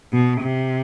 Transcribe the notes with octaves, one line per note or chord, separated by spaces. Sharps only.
B2
C3